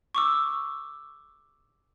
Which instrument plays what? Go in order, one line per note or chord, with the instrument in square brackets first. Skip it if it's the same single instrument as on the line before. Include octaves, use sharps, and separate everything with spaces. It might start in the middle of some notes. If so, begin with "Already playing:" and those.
[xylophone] C#6 D6 E6